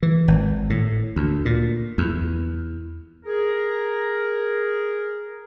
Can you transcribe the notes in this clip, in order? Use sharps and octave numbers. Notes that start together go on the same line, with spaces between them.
E3
G#1
A2
D2
A#2
E2
G#4 A#4